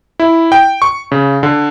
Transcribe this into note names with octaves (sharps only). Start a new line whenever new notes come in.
E4
G5
C#6
C#3
D3